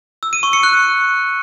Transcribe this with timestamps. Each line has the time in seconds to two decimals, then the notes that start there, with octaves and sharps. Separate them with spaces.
0.23 E6
0.33 D#7
0.43 C#6
0.53 C#7
0.63 F#6